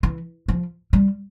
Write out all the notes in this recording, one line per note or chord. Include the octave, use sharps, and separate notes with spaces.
E3
F3
G3